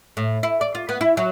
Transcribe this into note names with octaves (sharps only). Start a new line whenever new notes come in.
A2
E4
D5
F4
B3
E4
F#3